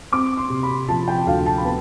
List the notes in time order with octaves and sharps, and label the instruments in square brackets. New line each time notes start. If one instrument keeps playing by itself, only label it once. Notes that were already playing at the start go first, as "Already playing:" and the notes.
[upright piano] C4 D6
C6
C3
B5
F3 A5
G5
D2 F5
A5
B5
B3 A5